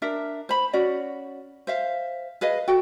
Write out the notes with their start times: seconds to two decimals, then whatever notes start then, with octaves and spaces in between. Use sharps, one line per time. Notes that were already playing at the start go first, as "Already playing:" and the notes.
0.02 D4 A#4 E5
0.49 C5 B5
0.73 C#4 F#4 D5
1.67 C5 E5 F5
2.41 G#4 B4 D#5 F5
2.68 F#4 A4 G5